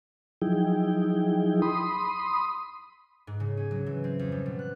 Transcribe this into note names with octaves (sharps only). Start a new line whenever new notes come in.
F3 F#3 D#4 E4 G#4 G5
B5 C6 D#6
G#2
C#3
C#4
F#3
E3
C4
F2
G3
B2
F#6